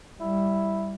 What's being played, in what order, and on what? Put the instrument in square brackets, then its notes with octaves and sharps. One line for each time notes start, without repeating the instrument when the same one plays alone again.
[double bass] G3 [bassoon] E4